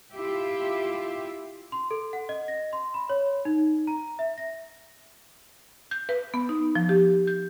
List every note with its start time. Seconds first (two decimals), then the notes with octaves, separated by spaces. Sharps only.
0.12 E4 F4 G4 E5
1.72 C6
1.91 A4
2.13 F#5
2.29 D#5
2.48 A#6
2.73 C6
2.94 B5
3.09 C#5
3.45 D#4
3.87 A#5
4.19 E5
4.38 A#6
5.91 G6
6.09 B4
6.34 B3
6.49 D#4
6.75 F3
6.89 G4
7.27 G6